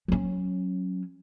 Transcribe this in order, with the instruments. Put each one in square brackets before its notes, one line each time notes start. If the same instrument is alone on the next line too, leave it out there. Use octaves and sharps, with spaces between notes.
[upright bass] F#3 C#4